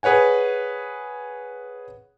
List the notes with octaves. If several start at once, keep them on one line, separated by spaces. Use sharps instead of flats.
G#4 B4 C#5 F#5 G#5